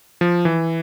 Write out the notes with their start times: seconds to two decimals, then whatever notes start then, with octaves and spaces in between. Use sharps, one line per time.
0.21 F3
0.45 E3